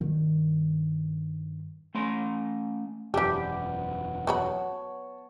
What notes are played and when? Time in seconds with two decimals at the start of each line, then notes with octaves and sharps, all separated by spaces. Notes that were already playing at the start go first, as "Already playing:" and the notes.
0.01 G2 D#3
1.95 A3 C#4 C6
3.14 E1 F#2 E3 B3 D4 G4
4.27 F#3 B3 C#5 A5 B5